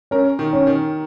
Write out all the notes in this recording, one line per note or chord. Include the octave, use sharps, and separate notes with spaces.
C#4 A#4
D#3
C#4
D#3